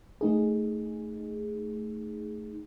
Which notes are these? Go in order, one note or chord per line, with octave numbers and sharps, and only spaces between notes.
A3 D#4 G#4